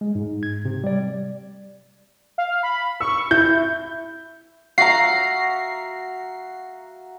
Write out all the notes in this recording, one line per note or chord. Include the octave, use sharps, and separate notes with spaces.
G#3
G#2
G#6
C3
G3 D5
F5
B5
C#6 E6
E4 G6
F#4 E5 F5 A#5 C7